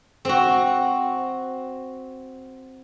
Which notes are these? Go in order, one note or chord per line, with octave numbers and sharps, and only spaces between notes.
C4 F#4